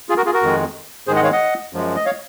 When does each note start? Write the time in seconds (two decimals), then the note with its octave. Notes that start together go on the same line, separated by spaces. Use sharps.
0.09 F4 G#4
0.17 F#4 A#4
0.25 F4 G#4
0.33 F#4 A#4
0.42 F2 D#3 G#3
1.07 G#2 D#3 G#3 G#4 C5
1.16 D#5 F#5
1.24 C#5 F5
1.32 D#5 F#5
1.73 F#2 F3 G#3
1.96 D#5
2.06 C#5 F5